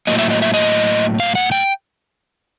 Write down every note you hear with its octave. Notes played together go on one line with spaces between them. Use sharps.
A2 F#3 A#3 D#5
E5
D#5
E5
D#5
F5
F#5
G5